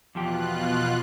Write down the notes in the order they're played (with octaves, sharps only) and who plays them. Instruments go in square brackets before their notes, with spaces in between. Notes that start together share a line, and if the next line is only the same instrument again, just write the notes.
[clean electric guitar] E2 F3 G4 [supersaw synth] B2 F4 F#6